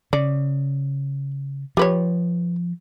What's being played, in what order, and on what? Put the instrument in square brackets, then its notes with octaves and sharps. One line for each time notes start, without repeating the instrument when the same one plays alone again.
[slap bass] C#3 [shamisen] D5
[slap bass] F3 [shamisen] G4 B4 C#5